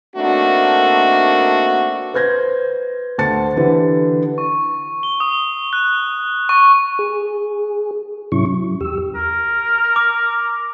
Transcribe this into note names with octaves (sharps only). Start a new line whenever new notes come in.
A3 A#3 C4 D4 D#4 F#4
B4 C5 G6 G#6 A#6
D2 C5 A5 A6 C#7
D3 E3 G4 B4
C#6
G7
D#6
F#6
C#6
G#4
G#2 C3 F#3 C#4 E4 C#6
F#3
E2 G4 E6
A#4
D6